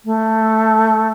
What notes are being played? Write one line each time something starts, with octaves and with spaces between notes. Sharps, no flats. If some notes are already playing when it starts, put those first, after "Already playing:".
A3